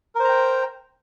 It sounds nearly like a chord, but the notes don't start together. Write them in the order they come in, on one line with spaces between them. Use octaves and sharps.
A#4 C5 A#5 G5